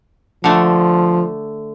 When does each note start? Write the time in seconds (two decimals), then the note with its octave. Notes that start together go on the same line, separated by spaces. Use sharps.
0.44 D3 F3 A3